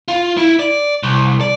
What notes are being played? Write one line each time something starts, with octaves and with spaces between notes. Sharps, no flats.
F4
E4
D5
C2
D5